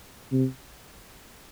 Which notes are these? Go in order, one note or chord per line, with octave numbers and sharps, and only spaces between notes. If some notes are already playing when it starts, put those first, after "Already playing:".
C3